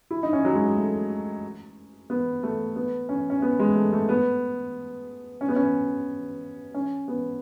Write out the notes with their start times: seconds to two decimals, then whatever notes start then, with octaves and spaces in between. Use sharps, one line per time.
0.11 E4
0.23 D#4
0.33 C#4
0.45 F#3
0.54 G#3
0.77 A3
2.10 B3
2.43 A3
2.76 B3
3.09 C#4
3.30 C#4
3.42 B3
3.59 G#3
3.75 A3
3.93 A3
4.09 B3
5.41 C#4
5.49 B3
5.56 C#4
6.74 C#4
7.08 B3